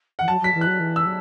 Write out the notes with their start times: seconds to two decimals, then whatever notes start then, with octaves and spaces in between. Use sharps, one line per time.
0.19 E3 F#5
0.28 F#3 A5
0.40 F#3 B6
0.54 E3
0.61 F#3 F#6
0.79 E3
0.96 E6
1.05 F#3